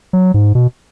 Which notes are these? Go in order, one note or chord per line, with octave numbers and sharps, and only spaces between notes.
F#3
G#2
B2